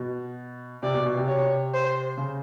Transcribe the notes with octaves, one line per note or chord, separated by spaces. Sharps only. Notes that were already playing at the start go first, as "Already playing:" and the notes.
Already playing: B2
C3 D5
B2
B2
C3
C3 C#5
C5
C#3